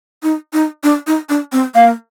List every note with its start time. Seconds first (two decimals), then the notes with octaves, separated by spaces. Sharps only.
0.23 D#4
0.53 D#4
0.84 D4
1.07 D#4
1.29 D4
1.52 C4
1.75 A#3 F5